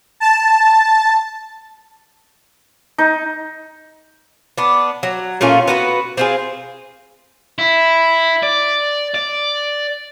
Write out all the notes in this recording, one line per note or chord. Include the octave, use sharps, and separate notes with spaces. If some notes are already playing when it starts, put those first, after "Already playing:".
A5
D#4
B3 D4
F#3
A#2 A3 C#4 F4
B3 F#4 B4
C4 F4 G#4
E4
D5
D5